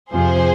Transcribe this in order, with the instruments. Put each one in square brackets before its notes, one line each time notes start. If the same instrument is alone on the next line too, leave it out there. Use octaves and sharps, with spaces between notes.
[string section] F2 C3 F3 G#4 C5